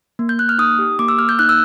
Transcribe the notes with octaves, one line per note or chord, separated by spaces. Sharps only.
A#3
G6
A#3 F#6
F6
D#4 D#6
G4
A#3 D6
E6
A#3 F6
G6
D#4 F#6
E6